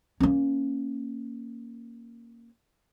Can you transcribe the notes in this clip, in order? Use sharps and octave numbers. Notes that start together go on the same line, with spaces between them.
A#3 C#4